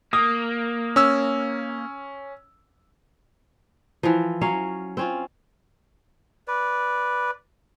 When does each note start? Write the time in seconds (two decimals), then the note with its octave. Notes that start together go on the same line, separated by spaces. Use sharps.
0.13 A#3 D#6
0.96 C#4 E6
4.03 E3 F3
4.41 F#3 C#4 F5
4.97 C4 C#4 F4
6.48 B4 D5